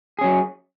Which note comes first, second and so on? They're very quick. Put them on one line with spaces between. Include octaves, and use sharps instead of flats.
G#4 C#4 F#3